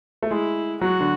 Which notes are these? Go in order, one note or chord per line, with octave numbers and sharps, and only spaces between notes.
A3
G#3 E4
F#3 F#4
D3